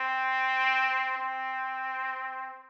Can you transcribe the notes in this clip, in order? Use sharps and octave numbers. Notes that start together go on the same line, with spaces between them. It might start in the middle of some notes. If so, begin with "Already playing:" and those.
Already playing: C4
C4